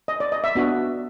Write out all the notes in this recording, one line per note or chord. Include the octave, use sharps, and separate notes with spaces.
D#5
D5
D#5
E5
B3 D4 F#4